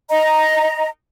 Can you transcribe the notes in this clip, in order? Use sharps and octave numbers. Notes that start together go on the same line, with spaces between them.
D#5 A#5